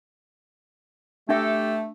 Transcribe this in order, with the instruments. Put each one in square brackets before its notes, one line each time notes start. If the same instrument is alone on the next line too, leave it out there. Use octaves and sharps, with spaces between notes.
[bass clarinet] A3 [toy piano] D4 E5 [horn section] G4 A4